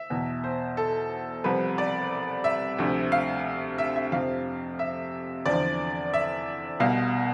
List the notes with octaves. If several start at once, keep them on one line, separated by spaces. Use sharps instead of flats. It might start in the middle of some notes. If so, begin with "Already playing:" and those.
Already playing: E5
E2 B2
C5
A4
C2 C3 F3 B4
D5
E5
D2 C3 F3
F5
E5
E5
F2 C3 F3 F5
E5
E2 D3 F3 D5
E5
C2 B2 F5